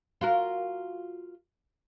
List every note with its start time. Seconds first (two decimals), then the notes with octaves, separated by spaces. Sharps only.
0.21 F4 F#4 A#4